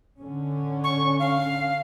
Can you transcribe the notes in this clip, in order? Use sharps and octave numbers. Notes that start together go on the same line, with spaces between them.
D3 C#4
C#6
F5